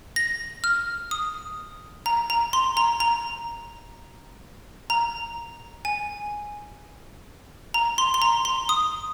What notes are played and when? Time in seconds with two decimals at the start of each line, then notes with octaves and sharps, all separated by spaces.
0.16 A#6
0.64 F6
1.11 D#6
2.06 A#5
2.30 A#5
2.53 C6
2.77 A#5
3.00 A#5
4.90 A#5
5.85 G#5
7.74 A#5
7.98 C6
8.14 C6
8.22 A#5
8.45 C6
8.69 D#6